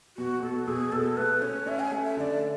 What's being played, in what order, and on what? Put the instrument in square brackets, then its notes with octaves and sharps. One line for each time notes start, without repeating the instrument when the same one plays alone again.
[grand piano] B2 [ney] F#4
[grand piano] B2 [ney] A4
[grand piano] B2 [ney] G#4
[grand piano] B2 [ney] A4
[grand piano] A3 [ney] B4
[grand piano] C#4 [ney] C#5
[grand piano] C#4 [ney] E5
[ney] G#5
[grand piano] A3
[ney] E5
[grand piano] D3 [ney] D5 E5